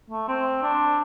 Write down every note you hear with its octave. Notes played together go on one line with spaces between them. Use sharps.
A3
C4
D4